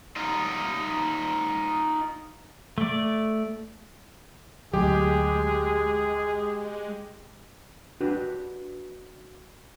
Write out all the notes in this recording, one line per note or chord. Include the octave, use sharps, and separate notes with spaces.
D#4 F4
A3 D5
D2 F#3 G#3 G4 G#4
D4 F#4 G4 B4